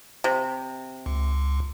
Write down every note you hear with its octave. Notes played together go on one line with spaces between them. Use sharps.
C3
C#2